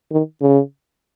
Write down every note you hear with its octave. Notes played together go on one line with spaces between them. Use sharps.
D#3
C#3